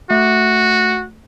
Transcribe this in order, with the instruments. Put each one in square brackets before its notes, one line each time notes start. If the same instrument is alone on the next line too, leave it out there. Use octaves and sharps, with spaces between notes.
[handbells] A3 [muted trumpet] F#4